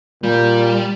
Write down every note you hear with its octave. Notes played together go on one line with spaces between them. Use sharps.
A#2 G3